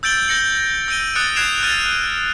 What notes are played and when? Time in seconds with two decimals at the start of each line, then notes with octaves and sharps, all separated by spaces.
0.03 E6 G6 A6 D7 F#7 G7
0.28 G6 A#6 C#7 F#7
0.88 E6 G6 D7 D#7 G7
1.15 D#6 F#6 A6 C#7 D7
1.36 F#6 G#6 C7 D7 E7 F7
1.63 F6 F#6 A6 D#7 F7